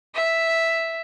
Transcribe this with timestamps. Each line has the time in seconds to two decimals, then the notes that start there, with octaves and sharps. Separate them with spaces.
0.15 E5